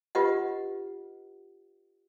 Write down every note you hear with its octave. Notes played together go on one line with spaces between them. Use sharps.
F4 G4 B4 D#5 F#5